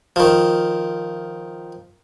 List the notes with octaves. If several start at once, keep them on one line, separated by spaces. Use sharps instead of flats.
D#3 F3